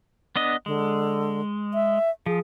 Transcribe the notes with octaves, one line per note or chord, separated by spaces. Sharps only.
B3 D4 D#5
D3 G#3
E5
F3 G#4